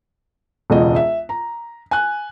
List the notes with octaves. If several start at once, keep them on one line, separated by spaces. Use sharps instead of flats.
E1 C#2 D#5
E5
A#5
G#5 F#6